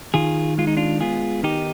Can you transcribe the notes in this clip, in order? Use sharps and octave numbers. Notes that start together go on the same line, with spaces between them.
D#3 F4 G#4
G#3 F4
D#4
D4 F4
B3 F4 G#4
D#3 D#4 G4